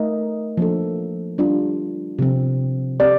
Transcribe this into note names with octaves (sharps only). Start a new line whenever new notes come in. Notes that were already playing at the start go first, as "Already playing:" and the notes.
Already playing: A3 D#4 A#4 D#5
F3 A#3 D4 A4
G3 D4 F4
C3 F3 C4
C4 G4 D5